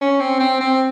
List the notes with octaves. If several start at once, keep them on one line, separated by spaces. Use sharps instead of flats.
C#4
C4
C4
C4